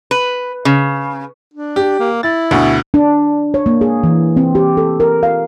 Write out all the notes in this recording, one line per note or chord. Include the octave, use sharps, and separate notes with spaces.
B4
C#3
D4
G4
A#3
E4 A6
D2 B2
D4
C#5
A#3
G#4
E3
C4
G4
A4
A#4
F5